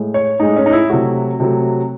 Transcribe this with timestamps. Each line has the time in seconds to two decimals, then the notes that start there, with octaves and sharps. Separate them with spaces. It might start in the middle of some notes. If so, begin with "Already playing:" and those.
Already playing: A2 G#3
0.14 C#5
0.40 A2 G#3 D#4
0.56 C#4
0.66 D#4
0.73 E4
0.90 C3 F#3 A3 F#4
1.40 C3 F#3 A3